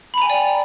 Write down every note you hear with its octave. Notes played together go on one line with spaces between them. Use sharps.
D5 G5 G#5 A#5 B5